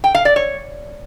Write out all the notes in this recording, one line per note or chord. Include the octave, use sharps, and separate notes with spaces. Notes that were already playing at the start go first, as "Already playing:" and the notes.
G5
F5
D5
C#5